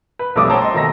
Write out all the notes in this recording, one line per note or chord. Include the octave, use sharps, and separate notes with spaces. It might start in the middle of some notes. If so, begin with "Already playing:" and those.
B4
B1 F2 G3 A3 D6 D#6
A4 C5 C#5 G5 A5 A#5
D#5 C6
B2 D#3 A3 A#5 E6 A#6